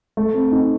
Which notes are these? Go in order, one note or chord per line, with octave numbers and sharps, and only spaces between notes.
A3
C4
D#4